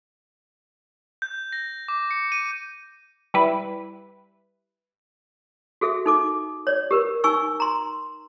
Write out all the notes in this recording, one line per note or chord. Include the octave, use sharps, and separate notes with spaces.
G6
A#6
D6
C#7
D#7
G3 E4 B4
F#4 G#4 A4 E5
D#4 A4 D6
C#5 D5
G4 A#4 B4
D#4 G#5 C#6 E6
A#5 C6